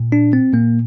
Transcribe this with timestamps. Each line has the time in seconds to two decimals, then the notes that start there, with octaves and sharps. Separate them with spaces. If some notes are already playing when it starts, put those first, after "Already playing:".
Already playing: A#2
0.12 D4
0.33 C4
0.53 A#2 A#3